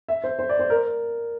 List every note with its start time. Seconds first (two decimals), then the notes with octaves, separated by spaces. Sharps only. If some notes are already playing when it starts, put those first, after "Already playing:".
0.08 E5
0.24 C5
0.39 C5
0.49 D5
0.59 C5
0.70 A#4